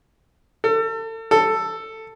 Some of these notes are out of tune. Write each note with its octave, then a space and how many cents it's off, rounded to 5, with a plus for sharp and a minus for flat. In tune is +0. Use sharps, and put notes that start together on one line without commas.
A4 +35
A4 +10